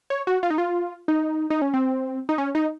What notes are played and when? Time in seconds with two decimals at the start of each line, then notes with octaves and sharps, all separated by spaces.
0.10 C#5
0.27 F#4
0.43 F4
0.50 D#4
0.58 F4
1.08 D#4
1.50 D#4
1.62 C#4
1.74 C4
2.29 D#4
2.38 C#4
2.55 D#4